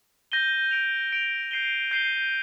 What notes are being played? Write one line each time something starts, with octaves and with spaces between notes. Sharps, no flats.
G6 A#6 D#7 G7
G6 D7 F7
G6 D7 F7
G6 C7 D#7 G7
G6 C7 D#7 G7